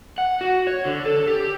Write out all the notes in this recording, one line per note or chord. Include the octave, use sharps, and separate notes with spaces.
F#5
F#4
C#5
D3
A4
G4